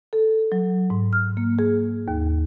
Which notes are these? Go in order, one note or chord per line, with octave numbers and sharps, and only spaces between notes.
A4
F#3
G#2
F6
A#3
G#4
D#2